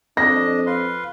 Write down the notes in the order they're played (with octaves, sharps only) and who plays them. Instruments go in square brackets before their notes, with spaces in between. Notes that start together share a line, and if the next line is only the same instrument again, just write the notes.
[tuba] F2 [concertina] D4 D#5 [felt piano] A#6
[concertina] F4 B4 C6